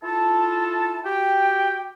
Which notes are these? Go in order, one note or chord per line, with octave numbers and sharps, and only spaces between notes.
E4 F4 A4 A5
F#4 G4 G5